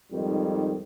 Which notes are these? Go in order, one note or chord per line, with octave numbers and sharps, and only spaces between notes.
F2 G#2 D#3 G3